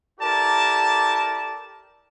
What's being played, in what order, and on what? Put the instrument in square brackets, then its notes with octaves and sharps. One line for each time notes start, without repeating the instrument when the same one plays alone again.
[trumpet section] E4 G4 A4 A#4 D5 A5